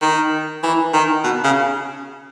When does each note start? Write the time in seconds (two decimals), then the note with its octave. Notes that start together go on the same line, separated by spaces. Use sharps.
0.02 D#3
0.63 E3
0.93 D#3
1.24 B2
1.44 C#3